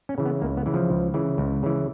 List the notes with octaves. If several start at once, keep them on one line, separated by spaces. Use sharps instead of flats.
C#4
C#3 E3
B3
C#2 A#3
B3
C#3 E3
F3
C#2
C#3 E3
C#2
C#3 E3